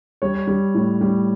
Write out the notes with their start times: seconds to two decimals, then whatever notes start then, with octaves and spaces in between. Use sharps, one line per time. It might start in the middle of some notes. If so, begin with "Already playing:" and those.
0.22 G3 C#5
0.47 G3
0.75 A2
1.01 G3